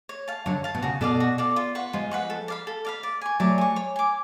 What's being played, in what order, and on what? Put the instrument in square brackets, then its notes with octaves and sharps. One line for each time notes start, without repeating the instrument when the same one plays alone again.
[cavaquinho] C#5
F5 A5
[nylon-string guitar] D3 F#3 [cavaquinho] C#5
[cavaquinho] F5 A5
[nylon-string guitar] B2
[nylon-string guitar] C#3 [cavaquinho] F#4
[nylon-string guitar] B2 [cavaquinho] A4 D5 F5
[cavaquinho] F#4
A4 D5 F5
F4
B4 F#5 C#6
[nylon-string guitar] F3 G#3 [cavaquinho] F4
[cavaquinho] B4 F#5 C#6
A4
D5 F5 B5
A4
D5 F5 B5
D5
G#5 C#6
[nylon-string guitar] F#3 A3 [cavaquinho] D5
[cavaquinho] G#5 C#6
C#5
G#5 D6